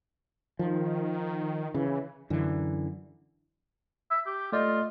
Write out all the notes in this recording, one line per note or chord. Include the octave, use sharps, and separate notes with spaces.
D#3 F3
C#3 E3
F#2 D3 E3
E5
G4
A3 F4 D5 D#5